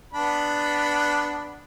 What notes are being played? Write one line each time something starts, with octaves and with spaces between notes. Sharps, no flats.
B3 D4 B5